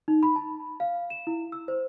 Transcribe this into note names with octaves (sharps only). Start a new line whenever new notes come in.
D#4
B5
A5
F5
E7
E4
E6
C5